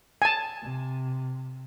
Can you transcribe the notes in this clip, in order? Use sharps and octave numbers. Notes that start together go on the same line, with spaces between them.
G#5 A5
C3